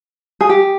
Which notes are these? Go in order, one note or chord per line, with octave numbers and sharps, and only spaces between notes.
G#4
G4